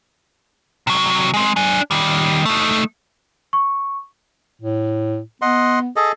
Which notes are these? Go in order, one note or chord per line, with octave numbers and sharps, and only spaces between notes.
C3 F#3
G#3 C4
D4 G#5
D#3 G3
A3 D#4
C#6
A2
B3 D#5 F#5 C6
G#4 A4 D#5